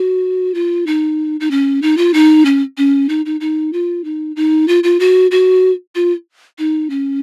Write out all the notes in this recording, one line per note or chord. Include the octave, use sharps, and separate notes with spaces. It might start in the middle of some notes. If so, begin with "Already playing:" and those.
Already playing: F#4
F4
D#4
D#4
C#4
D#4
F4
D#4
C#4
C#4
D#4
D#4
D#4
F4
D#4
D#4
F4
F4
F#4
F#4
F4
D#4
C#4